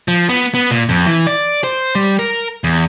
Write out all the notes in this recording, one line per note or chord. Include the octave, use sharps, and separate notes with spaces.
F3
B3
B3
A#2
F2
E3
D5
C5
G3
A#4
E2